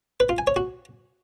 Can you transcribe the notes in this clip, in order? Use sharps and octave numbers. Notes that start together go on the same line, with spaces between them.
B4
F4
G#5
C#5
F#4